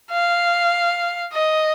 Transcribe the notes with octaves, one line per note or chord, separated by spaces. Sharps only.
F5
D#5